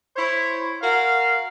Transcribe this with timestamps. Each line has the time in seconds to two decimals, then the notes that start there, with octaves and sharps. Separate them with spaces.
0.16 E4 C5 C#5
0.82 F#4 A#4 F5